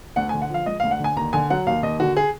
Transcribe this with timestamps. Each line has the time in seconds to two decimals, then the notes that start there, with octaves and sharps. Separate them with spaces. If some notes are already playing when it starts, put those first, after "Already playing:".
0.16 D2 F#5
0.29 G#5
0.34 D3
0.42 F#5
0.50 F3 F5
0.66 G#3 D#5
0.80 F5
0.84 D2
0.91 F#5
1.00 D3 G#5
1.16 D#2 A#5
1.33 D3 G#5
1.50 F#3 F#5
1.67 D#2 F5
1.83 D#2 D#5
2.00 D3 F#4
2.17 G#4